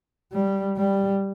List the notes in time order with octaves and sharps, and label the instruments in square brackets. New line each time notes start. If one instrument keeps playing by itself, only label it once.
[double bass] G3
G3